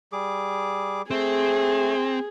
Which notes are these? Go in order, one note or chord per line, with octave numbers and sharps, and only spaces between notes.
G3 G#4 D6
A3 C4 G#4